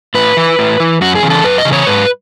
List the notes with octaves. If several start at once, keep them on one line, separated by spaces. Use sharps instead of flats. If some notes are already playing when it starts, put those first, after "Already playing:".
A2 B4
E3
A2
E3
F#2 F#4
G#4
C#3 E3
A4
F#2 B4
D#5
C#3 E3
C#5
G#2 B4